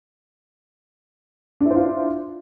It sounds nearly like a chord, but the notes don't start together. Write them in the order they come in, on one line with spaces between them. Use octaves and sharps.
D4 E4 C5 F4